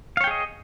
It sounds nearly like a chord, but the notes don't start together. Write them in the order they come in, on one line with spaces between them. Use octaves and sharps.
F5 C#5 G5 G#4 D#5